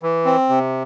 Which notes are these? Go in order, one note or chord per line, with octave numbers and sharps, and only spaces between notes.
E3
C4
C3